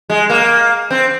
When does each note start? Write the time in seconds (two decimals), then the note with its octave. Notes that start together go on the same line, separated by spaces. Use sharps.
0.10 G#3
0.30 A#3
0.91 C4